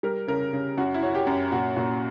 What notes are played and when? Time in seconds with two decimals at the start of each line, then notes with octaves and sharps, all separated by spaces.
0.03 G3 A#4
0.28 C#3 A#4
0.53 C#3
0.77 F#2 F#4
0.94 E4
1.03 C#4 F#4
1.15 G4
1.27 F#2
1.52 A#2 F#4
1.76 A#2 F#4